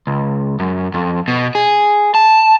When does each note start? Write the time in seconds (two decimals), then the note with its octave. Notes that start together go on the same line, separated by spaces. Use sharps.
0.07 C#2
0.60 F#2
0.94 F2
1.28 B2
1.55 G#4
2.15 A5